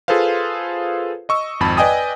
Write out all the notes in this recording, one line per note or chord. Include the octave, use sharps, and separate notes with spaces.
F4 G#4 A4 B4 C5 F5
D#5 C#6 E6
G#1 F2 A5 B5
B4 D5 D#5 G5 G#5 D#6